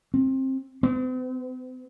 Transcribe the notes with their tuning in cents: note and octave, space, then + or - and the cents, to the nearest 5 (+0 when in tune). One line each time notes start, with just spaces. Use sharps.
C4 +20
C4 -45